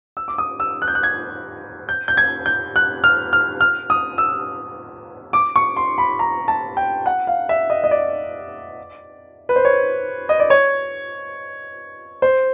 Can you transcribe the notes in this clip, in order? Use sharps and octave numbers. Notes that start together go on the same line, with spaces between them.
E6
D6
D#6
E6
F#6
G6
F#6
G#6
G6
G6
G#6
G6
F#6
F6
F6
F6
D#6
E6
D6
C#6
C6
B5
A#5
A5
G5
F#5
F5
E5
D#5
D#5
D5
B4
C5
C#5
D#5
D5
C#5
C5